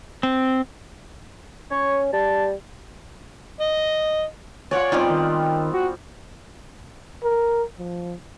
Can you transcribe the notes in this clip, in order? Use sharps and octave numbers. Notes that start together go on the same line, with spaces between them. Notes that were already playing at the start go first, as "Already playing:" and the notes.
C4
C#4 C#5
G3 A5
D#5
F4 C#5 D5 F#5 G#5
G3 B3 C4 D#4 F4 D5
D#3
F#4
A#4
F3